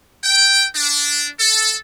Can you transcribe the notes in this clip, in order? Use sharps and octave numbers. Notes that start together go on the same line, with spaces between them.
G5
D4
A4